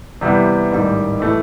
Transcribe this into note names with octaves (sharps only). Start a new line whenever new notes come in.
C3 E3 G3 B3
A1 G#2 D#3 G3
A2 E3 A3